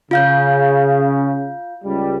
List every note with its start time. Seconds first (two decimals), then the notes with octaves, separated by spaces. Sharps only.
0.11 C#3 F4 F5 G6
1.84 C#2 G3